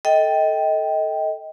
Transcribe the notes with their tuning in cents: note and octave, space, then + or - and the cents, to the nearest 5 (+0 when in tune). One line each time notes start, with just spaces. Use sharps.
A4 +0 D#5 +25 G5 +0